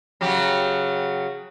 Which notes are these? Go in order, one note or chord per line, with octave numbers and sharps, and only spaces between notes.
C#3 F#3 G4